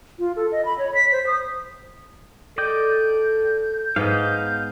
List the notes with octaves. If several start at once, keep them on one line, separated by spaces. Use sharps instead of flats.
F4
A4
D#5
B5
C#5
B6
C5
D#6
A4 D5 D#5 G5 G6
G#2 B3 D#5 F5